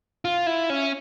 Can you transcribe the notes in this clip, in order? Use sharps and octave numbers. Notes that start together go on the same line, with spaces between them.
F4
E4
C#4